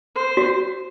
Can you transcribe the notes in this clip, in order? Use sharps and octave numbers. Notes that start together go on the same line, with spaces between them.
C5
F#4